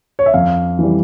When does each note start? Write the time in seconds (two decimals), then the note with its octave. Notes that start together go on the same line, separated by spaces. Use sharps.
0.19 C#5
0.26 E5
0.34 F2 F5
0.79 E3 G3